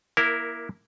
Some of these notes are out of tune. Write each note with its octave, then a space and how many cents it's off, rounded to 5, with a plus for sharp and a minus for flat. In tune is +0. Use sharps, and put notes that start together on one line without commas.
A#3 +15 E4 +0 A#4 -10